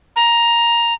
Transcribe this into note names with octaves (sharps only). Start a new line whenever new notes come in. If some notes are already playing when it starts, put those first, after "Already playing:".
A#5